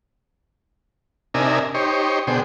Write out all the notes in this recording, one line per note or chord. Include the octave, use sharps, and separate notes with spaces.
C3 D4 D#4 A#4 E5 G#5
D#4 G4 C5 C#5
B2 D3 G#4 C5 G5